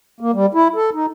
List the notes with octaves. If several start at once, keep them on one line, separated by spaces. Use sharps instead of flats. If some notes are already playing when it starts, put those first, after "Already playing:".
A#3
G3
E4
A4
D#4